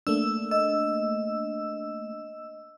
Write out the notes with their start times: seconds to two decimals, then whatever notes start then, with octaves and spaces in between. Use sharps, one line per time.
0.07 A3 A#3 D4 E6
0.51 D#5 E6